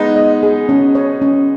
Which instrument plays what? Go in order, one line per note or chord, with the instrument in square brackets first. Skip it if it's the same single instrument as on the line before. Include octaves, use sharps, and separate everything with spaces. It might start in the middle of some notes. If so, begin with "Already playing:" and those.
Already playing: [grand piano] G#3 B3 D#4
[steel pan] D#5
G#4
C#4
C#5
C#4